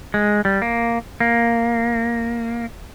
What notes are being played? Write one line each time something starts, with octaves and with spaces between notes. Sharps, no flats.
G#3
G3
A#3
A#3